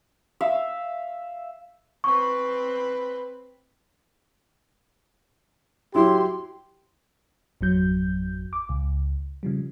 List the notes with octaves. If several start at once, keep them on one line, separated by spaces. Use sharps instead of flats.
E5 F5
C4 B4 C#6
F#3 E4 G4 C6
G#1 F2 F#3 G6
D6
C#2
C#3 F3 G3